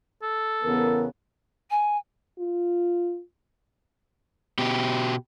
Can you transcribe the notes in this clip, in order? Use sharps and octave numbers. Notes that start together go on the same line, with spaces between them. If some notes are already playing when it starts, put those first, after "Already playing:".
A4
E2 C#3 B3 A#4
G#5
F4
B2 G4